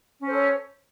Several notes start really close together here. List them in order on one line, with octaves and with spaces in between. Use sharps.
C#4 C5 A4 C#5